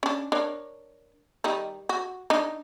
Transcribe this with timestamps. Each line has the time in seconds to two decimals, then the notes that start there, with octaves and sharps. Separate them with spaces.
0.03 C#4 D4
0.32 D4 A#4 C#5
1.44 D#3 G3 D#4
1.89 F#4
2.30 D4 D#4